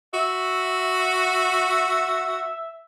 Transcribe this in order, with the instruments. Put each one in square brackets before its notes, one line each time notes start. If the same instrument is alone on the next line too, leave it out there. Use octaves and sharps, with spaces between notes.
[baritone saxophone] F#4 [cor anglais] E5